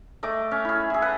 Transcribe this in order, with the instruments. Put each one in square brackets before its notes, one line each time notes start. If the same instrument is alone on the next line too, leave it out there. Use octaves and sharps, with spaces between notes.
[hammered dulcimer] A3 D#5 D6
C#4
E4 G#4
E4 G#4
A4 B4 F#5